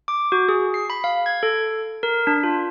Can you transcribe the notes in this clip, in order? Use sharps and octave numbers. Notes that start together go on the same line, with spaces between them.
D6
F#4
G#4
C7
B5
F5
G#6
A4
A#4
D4
F4